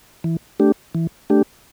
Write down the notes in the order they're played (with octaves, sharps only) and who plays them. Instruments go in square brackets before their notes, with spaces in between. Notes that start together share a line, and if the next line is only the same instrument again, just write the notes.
[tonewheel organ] E3
A3 D4 G4
E3
A3 D4 G4